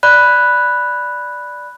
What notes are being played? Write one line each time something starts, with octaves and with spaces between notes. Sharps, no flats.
D5 B5 F#6